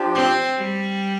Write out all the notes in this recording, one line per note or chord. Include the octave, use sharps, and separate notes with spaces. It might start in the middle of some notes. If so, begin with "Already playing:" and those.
Already playing: F3 D4 G4
C4
G3